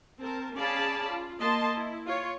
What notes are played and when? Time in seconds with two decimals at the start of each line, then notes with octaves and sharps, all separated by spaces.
0.20 C4 A#4 A5
0.55 C#4 G#4 D5 F5 A5 B5
1.09 F4
1.39 A#3 D#5 A5 C6
1.75 E4
2.06 F4 C#5